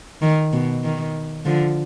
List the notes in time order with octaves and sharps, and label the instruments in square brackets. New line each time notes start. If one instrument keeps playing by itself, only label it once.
[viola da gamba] D#3
B2
D#3
D3 F3